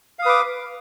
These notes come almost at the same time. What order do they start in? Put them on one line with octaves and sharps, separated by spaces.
F5 D#6 B4 D6